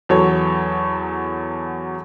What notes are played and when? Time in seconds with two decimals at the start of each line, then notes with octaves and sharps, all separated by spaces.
0.09 E2 F#3 A4 C#5